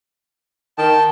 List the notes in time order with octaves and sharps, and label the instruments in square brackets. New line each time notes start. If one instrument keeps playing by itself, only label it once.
[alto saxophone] D#3 [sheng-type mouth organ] G5 A5